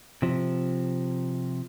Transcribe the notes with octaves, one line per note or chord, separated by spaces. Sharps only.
C3 F3